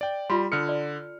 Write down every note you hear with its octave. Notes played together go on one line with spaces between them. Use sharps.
D5 G5
G3 F4 B5 C6
D3 A4 F6 C#7
D5